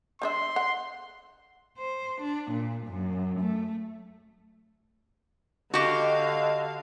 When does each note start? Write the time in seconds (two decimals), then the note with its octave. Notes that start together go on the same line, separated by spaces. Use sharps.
0.22 G3 D4 E5 C6
0.56 F#5
1.78 C5
2.22 D4
2.51 A#2
2.87 F#2
3.41 A3
5.74 D3 F#4 G4 D#5 F5